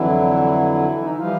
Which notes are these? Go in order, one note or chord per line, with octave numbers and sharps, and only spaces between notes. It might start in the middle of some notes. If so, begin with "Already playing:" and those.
Already playing: F2 D3 E3 F#3 E4
D#4
E4
E3 F3 G3 F4